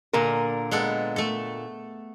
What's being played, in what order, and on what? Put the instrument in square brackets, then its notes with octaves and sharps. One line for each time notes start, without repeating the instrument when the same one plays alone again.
[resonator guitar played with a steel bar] A#2 D3 A#4
[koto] G#3 B3 A4
A3 A4